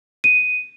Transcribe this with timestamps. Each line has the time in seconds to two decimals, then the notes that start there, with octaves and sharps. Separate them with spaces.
0.24 D#7